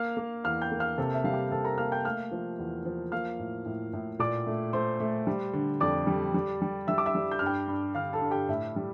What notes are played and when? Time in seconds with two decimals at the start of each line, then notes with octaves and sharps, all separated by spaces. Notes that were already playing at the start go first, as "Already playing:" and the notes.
Already playing: A#3 F5 F6
0.17 A#3
0.44 E2 F5 F6
0.62 G5 G6
0.72 A#3
0.80 F5 F6
0.98 C3 A4 A5
1.14 E5
1.24 G3 F5
1.33 G4 G5
1.51 C3 A4 A5
1.65 A#4 A#5
1.78 A#3 F5 F6
1.92 G5 G6
2.05 A3 F5 F6
2.31 F3
2.58 E2
2.85 F3
3.12 A#3 F5 F6
3.39 A2
3.65 A2
3.93 A2
4.19 A#2 D5 D6
4.47 A3
4.73 A3 C5 C6
5.00 A3
5.27 G3
5.53 D3
5.80 F2 D5 D6
6.07 G3
6.34 G3
6.62 G3
6.87 G3 E5 E6
6.98 D6
7.06 E5 E6
7.15 G3
7.31 G6
7.39 G2 F6
7.46 G5 G6
7.68 G2
7.95 D3 F5 F6
8.13 A4 A5
8.22 G2
8.31 G4 G5
8.49 A2 E4 E5
8.76 G3